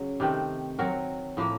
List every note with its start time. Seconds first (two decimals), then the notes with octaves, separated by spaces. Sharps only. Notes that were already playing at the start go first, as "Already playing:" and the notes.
Already playing: C#3 F#3
0.20 C3 D#3 A3 C4
0.79 F#3 C4 F#4 A#4
1.37 A2 F3 A#3